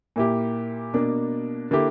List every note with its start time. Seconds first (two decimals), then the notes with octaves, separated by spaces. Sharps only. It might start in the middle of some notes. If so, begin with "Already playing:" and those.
0.16 A#2 A#3 E4 G4
0.94 B2 A#3 D4
1.71 D3 A#3 E4 G4